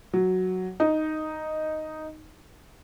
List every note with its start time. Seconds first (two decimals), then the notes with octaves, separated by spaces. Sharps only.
0.13 F#3
0.80 D#4